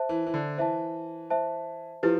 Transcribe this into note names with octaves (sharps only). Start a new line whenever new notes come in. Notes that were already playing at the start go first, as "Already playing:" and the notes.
Already playing: C5 E5 A5
E3
E3
D3
E3 C5 E5 A5
C5 E5 A5
F3 E4 G4 B4